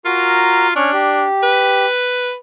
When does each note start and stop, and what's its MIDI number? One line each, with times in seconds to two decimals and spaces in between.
0.05 0.72 65
0.05 0.67 66
0.05 0.67 70
0.05 0.67 82
0.76 0.90 61
0.76 1.25 62
0.76 0.90 85
0.76 0.90 89
0.93 1.85 67
1.43 2.36 71